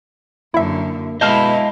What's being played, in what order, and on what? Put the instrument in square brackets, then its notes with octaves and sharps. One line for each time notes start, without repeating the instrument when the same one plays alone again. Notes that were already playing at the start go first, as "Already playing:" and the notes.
[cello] F#2 D3 [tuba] A#3 [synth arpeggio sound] E4 E5
[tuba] B2 [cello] G#3 E4 [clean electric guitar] D#5 F5 A5 [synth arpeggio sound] F6 G6